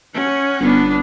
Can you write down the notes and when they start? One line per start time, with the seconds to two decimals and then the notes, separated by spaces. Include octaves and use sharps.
0.14 C#4 F#5
0.60 G1 B3 D4